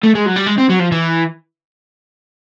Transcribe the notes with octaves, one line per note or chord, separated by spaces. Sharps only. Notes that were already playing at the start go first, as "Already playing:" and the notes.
A3
G#3
F#3
G3
G#3
C4
F#3
F3
E3